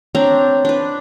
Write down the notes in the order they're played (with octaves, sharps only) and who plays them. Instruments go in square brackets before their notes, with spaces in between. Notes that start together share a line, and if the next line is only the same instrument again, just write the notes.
[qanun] C4 D4 A#5 [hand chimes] C#5
[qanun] D4 B4